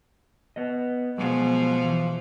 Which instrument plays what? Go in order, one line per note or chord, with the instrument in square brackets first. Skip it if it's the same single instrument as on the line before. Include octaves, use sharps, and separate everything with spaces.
[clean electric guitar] B3 D#5
[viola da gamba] B2 F3 B3 [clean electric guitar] F#3 G#3
[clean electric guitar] E3